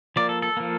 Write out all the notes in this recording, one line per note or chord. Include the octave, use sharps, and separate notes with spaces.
F3 A#3 D5
A4
A4
F3 A#3